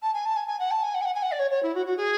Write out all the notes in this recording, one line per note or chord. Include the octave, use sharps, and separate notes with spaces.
A5
G#5
A5
G#5
G#5
F#5
A5
G#5
F#5
G#5
F#5
G#5
F#5
D5
C#5
C#5
E4
F#4
F#4
G#4